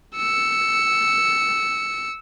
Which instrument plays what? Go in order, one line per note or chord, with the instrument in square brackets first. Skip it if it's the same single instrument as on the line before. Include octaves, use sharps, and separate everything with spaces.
[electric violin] E6 C#7